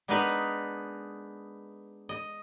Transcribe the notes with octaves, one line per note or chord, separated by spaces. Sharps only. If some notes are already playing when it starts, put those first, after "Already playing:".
G#3 B3 D4 D#4 A#4 B4
D#5